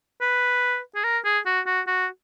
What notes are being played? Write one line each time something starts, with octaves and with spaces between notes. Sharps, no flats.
B4
G#4
A#4
G#4
F#4
F#4
F#4